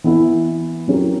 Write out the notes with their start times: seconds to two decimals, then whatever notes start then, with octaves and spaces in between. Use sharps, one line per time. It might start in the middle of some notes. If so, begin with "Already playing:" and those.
0.04 E3 B3 E4
0.88 F#3 C#4 E4 G4 A#4